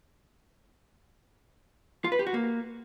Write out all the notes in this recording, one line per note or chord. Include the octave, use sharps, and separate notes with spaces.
F4
B4
G4
F#4
A#3